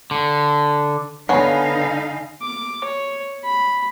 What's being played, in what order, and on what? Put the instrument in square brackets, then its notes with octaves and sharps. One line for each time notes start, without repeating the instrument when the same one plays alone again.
[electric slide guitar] D3
[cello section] D3 D#4 F5 [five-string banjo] B3 C#5 [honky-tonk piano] F#5 G#5 B5
[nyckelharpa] D6
C#5
B5